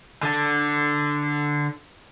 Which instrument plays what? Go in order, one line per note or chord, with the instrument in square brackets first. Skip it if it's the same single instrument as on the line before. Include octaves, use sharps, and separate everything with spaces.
[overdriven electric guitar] D3 D4